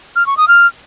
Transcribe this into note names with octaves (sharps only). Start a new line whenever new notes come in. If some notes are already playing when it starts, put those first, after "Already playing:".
F6
C#6
D#6
F6